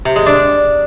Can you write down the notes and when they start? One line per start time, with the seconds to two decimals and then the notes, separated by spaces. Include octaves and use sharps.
0.05 C3
0.16 G#3
0.26 D4